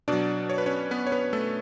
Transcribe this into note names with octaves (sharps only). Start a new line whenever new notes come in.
B2 F#3 D4 D5
C#5
B4
C#4 C#5
B3 B4
C#5
B3 B4
A3 A4